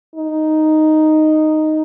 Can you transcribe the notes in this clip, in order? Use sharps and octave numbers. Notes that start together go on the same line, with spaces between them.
D#4